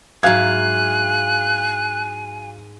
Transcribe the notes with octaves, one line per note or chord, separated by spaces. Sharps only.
G#2 F#3 E4 F5 G#5 F#6 G#6